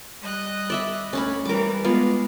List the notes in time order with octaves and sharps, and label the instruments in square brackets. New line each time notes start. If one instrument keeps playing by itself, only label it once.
[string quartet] G3 D#5 F#6
[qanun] D5 E5 B5
[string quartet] D2 [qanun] C#4 F#5 B5
[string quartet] E3 G3 [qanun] A#4 D6
[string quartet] G#3 [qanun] B3 F4 F5